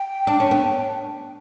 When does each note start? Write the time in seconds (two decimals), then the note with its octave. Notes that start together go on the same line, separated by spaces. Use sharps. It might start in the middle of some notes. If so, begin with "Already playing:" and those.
Already playing: G5
0.27 D4
0.40 C#4
0.51 B3